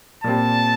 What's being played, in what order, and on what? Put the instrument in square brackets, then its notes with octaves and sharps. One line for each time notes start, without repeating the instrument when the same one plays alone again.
[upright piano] A#2 G3 C4 [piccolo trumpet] A5